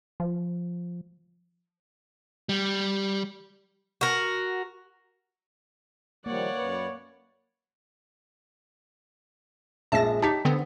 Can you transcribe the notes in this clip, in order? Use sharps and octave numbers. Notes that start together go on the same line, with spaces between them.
F3
G3
F#4 A#4
D#3 F3 G3 A#3 C#5 D5 F#5
F#2 B4
A#1 G#3 E5 A5 A#6
D#4 G4 A5 B6
D3 B3 C4